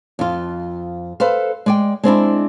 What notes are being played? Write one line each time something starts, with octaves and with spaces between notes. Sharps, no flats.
F2 F4
A4 B4 C5 F5
G#3 D5 G5
G#3 C4 D4 E4